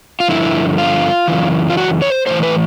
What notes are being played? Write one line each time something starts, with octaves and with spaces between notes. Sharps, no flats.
F4
G2 D3 F3 E4
F4
F#2 C#3 E3
F4
F#4
C#5
C5
A2 E3 C5
B4